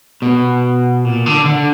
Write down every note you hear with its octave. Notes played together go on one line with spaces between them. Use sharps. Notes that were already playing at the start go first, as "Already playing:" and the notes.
B2
A#2
D3
D3